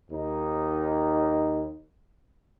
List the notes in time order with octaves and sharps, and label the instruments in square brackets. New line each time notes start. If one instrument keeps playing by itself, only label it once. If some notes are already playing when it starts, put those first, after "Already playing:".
[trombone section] D#2 D#4